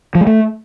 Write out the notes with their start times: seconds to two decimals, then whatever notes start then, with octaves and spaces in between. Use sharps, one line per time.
0.15 F3
0.21 G#3
0.27 A3